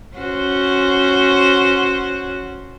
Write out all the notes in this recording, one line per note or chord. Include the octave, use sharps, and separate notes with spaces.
C#4 F#4 C5